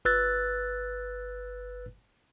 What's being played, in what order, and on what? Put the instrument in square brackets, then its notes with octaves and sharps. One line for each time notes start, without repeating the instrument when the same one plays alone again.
[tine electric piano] G1 B4 E6 F#6 A6